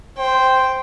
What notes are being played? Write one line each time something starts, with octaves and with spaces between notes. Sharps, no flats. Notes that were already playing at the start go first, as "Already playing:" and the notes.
C5 G5